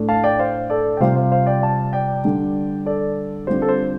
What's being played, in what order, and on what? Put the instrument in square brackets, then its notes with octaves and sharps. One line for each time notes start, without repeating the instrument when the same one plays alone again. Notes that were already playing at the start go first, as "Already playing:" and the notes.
Already playing: [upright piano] A2 A3 D4
[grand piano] F5 A5
D5 G5
C5 F5
A4 D5
G5
[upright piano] C3 G3 F4 [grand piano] C5 F5
[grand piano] C5 F5
C5 F5
D5 G5
F5 A5
D5 G5
[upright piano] D3 G3 D4
[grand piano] A4 D5
[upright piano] D3 G3 C4 F4 [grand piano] C5
[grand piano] A4
C5